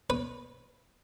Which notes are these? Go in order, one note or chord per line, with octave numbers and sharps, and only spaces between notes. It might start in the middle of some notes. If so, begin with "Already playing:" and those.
B4